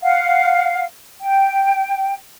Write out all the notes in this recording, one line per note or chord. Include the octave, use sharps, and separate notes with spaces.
F5 F#5
G5